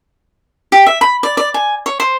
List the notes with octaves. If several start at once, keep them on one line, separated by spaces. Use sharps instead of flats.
G4
E5
B5
D5
D5
G#5
C#5
C5